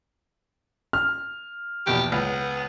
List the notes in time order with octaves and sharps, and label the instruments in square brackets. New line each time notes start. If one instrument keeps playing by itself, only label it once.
[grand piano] F6
[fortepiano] A#1 E2 B2 [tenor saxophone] G4
[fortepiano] C#2 [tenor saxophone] B3